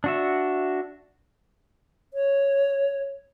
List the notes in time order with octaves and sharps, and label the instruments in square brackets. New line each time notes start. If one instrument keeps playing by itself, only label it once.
[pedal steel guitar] D4 F#4 E5
[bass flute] C#5